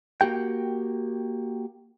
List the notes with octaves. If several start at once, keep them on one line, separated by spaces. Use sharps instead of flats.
A#3 F#4 G4 G5